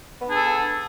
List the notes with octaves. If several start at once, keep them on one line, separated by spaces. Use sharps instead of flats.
B3 D4 G#4 A4